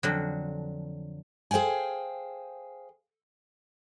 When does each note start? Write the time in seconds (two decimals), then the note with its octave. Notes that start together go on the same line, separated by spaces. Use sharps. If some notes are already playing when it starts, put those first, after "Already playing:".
0.03 F2 D3 F#3
1.51 G#4 C5 F5 G5 G#5